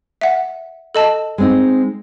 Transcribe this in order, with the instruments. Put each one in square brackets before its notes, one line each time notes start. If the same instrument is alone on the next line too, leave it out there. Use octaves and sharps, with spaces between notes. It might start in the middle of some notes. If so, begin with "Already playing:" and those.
[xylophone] E5 F#5
A4 D#5 A5
[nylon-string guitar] G#3 C4 D#4